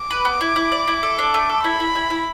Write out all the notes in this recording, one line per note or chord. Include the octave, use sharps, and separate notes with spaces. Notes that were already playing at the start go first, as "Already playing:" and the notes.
Already playing: D6
B4
B3
E4
E4
D5
E4
A4
D4
A3
A4
E4 B5
E4
E4
E4